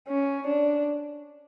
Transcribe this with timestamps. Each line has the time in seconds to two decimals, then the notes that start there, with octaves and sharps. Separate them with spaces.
0.08 C#4
0.47 D4